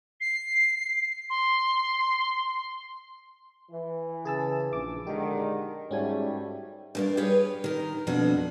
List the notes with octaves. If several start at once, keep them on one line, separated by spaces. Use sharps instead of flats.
C7
C6
E3
C#3 G#4 A5 E6
A#1 D6
D3 D#3 G#3 G4
G#2 G3 A3 C#4 F#4 G#5
G2 A#3 D5
G4 G#4 B4 C#5 F5
D#3 A#4
F2 B2 D4 F#4 A4